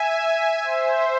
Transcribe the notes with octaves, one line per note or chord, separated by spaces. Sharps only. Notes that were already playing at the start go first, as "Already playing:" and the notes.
Already playing: E5 G#5
C5 E5